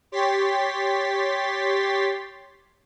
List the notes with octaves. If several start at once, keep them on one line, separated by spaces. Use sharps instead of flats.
G4 C#5 C6 A6 B6